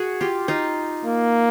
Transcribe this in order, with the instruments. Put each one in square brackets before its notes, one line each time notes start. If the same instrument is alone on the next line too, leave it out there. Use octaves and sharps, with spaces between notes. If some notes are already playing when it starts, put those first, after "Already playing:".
Already playing: [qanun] F#4 G#4
F4 G4
D#4 F4
[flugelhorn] A#3